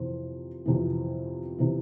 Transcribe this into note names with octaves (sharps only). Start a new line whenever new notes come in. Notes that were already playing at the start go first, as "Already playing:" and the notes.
Already playing: F2 C3 E3 C5
F2 C3 E3
C3 E3